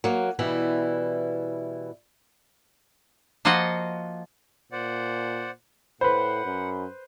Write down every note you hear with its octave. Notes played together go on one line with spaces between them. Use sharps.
F#3 A#3
B2 E3 G3 E4
F3 A#3 F4 F#4 D#5 F#5
A#2 C5 D5 F#5
A2 B4 C5 F#5 B5
F#2